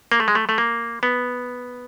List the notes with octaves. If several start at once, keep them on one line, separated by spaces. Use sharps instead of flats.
A#3
A3
G#3
A3
A3
A#3
B3